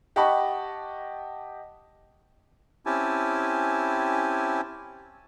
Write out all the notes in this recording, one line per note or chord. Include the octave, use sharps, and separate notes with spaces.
G4 D#5 F#5 A5 B5 C#6
C4 C#4 E4 G4 G#5 A5